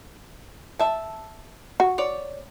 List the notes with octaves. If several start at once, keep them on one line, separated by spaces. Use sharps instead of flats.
E5 A5
F#4
C#5 D5